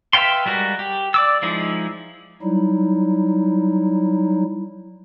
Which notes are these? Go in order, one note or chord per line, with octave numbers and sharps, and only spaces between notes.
B4 E5 F5 G5 C6
G3 G#3 F#4 A#4
G4
D5 D6 E6
F3 G#3 D#4 E4
F#3 G3 D#4 E4